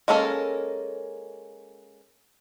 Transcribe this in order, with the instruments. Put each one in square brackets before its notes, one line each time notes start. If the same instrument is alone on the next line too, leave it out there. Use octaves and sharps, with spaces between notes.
[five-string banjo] G#3 A#3 C#4 A4 A#4